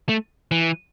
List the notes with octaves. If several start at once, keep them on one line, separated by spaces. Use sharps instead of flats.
A3
E3